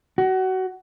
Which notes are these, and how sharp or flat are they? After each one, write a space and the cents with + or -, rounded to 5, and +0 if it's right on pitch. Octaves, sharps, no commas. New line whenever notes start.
F#4 +25